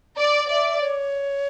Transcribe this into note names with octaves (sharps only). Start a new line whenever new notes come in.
D5
D5 E5
C#5